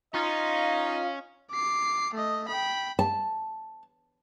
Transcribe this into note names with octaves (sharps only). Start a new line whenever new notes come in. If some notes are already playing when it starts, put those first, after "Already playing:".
C#4 D#4 F4 D#5
D6 C7
A3 D#5
G5 B5
A5